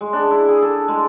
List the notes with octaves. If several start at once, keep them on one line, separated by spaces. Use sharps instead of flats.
G#3
D4
E4
G#4
A4
G#3